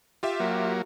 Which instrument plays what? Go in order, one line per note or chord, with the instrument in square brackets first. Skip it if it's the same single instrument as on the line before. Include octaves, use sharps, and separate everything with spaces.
[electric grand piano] F4 G4 E5
[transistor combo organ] F#3 A#3